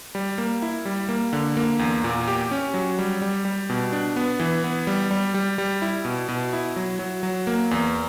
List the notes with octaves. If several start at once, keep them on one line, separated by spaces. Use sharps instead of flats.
G3
A#3
E4
G3
A#3
D3
A#3
E2
A#2
G4
C#4
F#3
G3
G3
G3
B2
D4
B3
E3
B3
G3
G3
G3
G3
E4
B2
B2
E4
F#3
F#3
F#3
A#3
E2